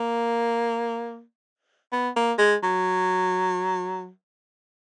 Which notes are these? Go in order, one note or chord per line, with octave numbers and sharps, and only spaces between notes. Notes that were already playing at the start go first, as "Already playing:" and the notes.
Already playing: A#3
B3
A#3
G#3
F#3